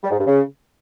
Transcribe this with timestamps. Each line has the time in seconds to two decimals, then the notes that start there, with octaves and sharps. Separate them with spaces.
0.03 G3
0.11 G#2
0.18 G2
0.26 C#3